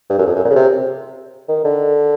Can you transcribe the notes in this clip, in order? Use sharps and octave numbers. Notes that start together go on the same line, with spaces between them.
G2
F#2
F2
F#2
A#2
C#3
C3
D#3
D3